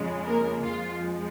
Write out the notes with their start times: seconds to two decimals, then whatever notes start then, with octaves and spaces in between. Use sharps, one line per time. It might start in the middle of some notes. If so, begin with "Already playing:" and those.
Already playing: F2 C#3 G#3
0.25 A#3 A#4
0.64 F2 F3 G#3 F4